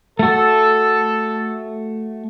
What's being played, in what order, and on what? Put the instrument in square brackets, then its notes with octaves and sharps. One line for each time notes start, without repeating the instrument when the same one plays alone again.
[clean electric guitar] A3 F#4 [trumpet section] A4